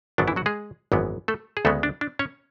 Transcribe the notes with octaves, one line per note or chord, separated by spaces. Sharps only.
G#1 F#2 D3 F#3 B3 D4
E3 E4
F#3 F#4
G#3 G#4
G#1 F#2 E3 G#3 B3
A3 A4
G#4
D2 C#3 G#3 A3 B3 A4
D4
D4
C#4 C#5